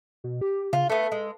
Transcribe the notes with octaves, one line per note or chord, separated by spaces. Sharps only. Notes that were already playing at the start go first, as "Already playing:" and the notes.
B2
G4
C#3 F4
A3 B3 A4
G#3